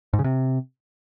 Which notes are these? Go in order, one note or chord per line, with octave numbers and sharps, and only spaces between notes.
G#2
C#3
C3